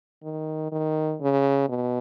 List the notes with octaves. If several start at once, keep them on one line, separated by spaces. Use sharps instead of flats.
D#3
D#3
C#3
B2